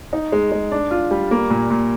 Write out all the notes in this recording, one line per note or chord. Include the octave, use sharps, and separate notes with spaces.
D#4
G#3
G#3
D4
F4
G3
A#3
A#2
A#2